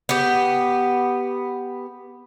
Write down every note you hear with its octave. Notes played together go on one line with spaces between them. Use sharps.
B3 G4